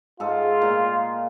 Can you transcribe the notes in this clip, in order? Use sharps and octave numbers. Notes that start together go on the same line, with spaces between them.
G#2 F4 A4 D#5
A#2